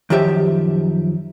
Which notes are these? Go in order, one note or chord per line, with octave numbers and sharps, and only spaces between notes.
F#2 D#3 F3 G4 E5